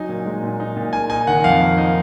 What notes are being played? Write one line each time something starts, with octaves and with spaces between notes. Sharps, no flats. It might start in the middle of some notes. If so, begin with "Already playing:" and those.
Already playing: F#3 D#4 G#5
A#2
G#3
A#2
D#4
A#2
A#3 G#5
D#4 G#5
D#3 F#5
F2 F5
A#3
D#4